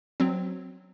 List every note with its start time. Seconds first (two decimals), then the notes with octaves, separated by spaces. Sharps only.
0.20 F#3 C4